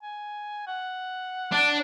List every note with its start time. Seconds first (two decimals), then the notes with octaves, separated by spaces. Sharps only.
0.03 G#5
0.67 F#5
1.52 D4